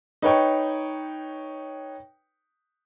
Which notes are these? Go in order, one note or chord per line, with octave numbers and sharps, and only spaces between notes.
D#4 B4 C#5 G5 C#6